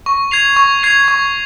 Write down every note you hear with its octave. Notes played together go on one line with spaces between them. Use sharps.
C#6
G#6 C7 F7
C#6
G#6 C7 F7
C#6